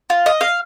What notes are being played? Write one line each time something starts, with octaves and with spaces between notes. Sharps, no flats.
F4
D#5
F5